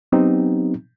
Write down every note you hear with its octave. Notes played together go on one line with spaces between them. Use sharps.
F#3 B3 C4 D#4 G4